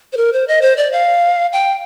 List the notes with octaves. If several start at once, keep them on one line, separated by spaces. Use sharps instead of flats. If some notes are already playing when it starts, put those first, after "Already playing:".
C5
A#4
C5
D#5
C5
D5
F5
G5